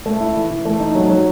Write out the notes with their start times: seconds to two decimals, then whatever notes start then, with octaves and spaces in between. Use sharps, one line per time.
0.06 A3
0.21 E4
0.36 E3
0.51 E3
0.65 A3
0.80 D#4
0.95 F#3
1.10 F#3